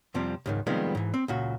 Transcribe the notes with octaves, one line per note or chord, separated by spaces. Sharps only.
F2 C3 F3 G3 C4
C#2 G#2 D#3
C3 D#3 F3 G3 G#3 B3
G#2 E3
C4
C#2 A#2 F#4